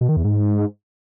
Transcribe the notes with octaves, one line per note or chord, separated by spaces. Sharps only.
B2
D#3
E2
G#2